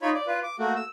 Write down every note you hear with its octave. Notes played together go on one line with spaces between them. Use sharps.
D#4 F4 C#5 B5
D5
F4 B4
D6
A3 A#3 F#4
E6